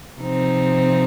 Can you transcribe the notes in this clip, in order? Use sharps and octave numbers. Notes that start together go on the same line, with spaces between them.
C3 F3 C4 D#4